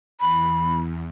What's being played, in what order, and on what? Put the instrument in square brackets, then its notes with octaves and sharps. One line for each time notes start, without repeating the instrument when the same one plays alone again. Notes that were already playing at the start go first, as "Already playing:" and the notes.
[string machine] E2 [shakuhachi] B5